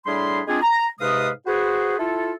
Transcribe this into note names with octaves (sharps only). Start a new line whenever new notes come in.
A2 G3 D4 G#4 B5 C6
G#3 C4 D4 F4 G4 G#4
A#5
G#2 C3 G#3 B4 F5 D#6
F#4 G#4 B4 C5
E4 F4 A4